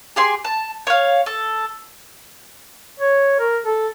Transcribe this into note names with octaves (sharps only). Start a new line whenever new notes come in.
G4 G#4 C6
A5
C#5 F5
A4
C#5
A#4
A4